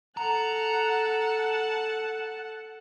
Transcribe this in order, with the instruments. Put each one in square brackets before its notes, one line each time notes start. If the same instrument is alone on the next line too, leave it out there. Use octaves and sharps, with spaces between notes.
[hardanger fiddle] A4 A5 [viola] F#5 [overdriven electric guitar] A#5